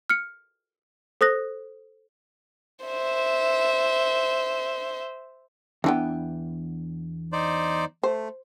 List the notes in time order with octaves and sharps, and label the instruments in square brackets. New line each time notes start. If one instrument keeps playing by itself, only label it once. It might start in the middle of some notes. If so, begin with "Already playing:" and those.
[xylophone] F6 C#7
A4 C5 D#6 F#6 A#6
[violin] C5 E5
[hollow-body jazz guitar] E2 D4 G5 [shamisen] E3 F3 B3
[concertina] D#4 C5 D5
[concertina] A3 [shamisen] C5